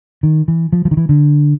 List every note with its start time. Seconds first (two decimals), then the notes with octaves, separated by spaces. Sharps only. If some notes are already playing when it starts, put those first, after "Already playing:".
0.23 D#3
0.48 E3
0.72 F3
0.85 F3
0.91 D#3
0.97 E3
1.09 D3